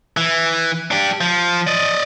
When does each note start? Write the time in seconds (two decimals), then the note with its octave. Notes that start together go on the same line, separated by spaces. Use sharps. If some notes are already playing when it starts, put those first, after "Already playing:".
0.17 E3
0.91 D4 G4
1.21 F3
1.67 D5 D#5